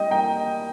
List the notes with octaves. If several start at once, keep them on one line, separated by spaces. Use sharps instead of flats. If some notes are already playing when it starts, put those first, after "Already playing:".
Already playing: G3 D#5 G5
A#3 G5 A#5